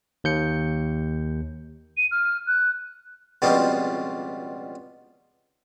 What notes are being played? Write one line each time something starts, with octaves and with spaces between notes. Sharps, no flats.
D#2 G6 C#7
D#7
F6
F#6
C#2 B2 F3 G3 C4